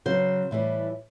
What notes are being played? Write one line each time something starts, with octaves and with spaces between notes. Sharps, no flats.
C#3 F#3 C5
A2 E3 G3